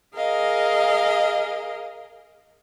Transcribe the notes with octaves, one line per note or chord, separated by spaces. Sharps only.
G#4 A#4 D#5 F5